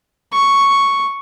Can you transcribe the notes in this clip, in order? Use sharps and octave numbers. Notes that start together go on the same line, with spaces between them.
C#6